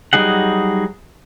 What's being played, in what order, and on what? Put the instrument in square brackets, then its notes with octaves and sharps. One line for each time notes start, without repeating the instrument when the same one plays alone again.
[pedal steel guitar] F#3 G3 D#4 G#4 F#5